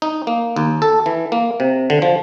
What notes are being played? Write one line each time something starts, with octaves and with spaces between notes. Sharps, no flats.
D#4
A#3
D#2
A4
E3
A#3
C3
D3
F3